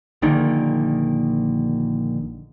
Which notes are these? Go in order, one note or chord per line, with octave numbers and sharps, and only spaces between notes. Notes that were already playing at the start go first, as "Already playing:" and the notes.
A#1 A#2 D3 D#3